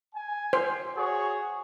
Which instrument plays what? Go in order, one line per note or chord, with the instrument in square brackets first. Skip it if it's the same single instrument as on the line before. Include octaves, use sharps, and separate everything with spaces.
[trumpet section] G#5
[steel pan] C5
[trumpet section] F#4 G#4 C#5